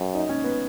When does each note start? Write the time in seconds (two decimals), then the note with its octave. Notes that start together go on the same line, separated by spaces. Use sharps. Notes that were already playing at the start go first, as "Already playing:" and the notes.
Already playing: F#2
0.15 D#4
0.29 C#4
0.44 B3